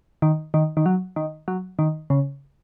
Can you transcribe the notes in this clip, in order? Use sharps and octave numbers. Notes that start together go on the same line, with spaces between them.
D#3
D#3
D#3
F#3
D#3
F#3
D#3
C#3